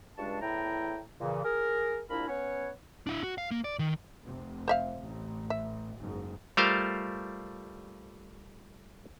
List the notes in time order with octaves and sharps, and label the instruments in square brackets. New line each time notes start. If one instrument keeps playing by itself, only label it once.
[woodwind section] C#2 G2 G#3 D4 A5 C#6
E2 A2 E4 G5 A#5
A#2 C#3 E3
G#4 A#4
C2 A#2 D4 E4 A#4 B5
B3 C#4 B4 C#5
[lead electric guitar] D4 E4
F#4
F5
A#3
D5
D#3
[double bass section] F1 C3
[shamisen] C5 E5 F5
[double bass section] A1
[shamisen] E5
[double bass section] F#1 G#2
[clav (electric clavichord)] G3 A3 F4 A#4 C5 F5